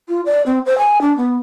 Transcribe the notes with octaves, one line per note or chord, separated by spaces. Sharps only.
F4
D5
C4
C5
G#5
D4
B3